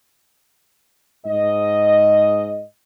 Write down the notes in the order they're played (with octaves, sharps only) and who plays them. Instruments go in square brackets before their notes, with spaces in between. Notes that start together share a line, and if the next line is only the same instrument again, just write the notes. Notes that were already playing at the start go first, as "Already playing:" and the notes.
[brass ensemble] G#2 D#5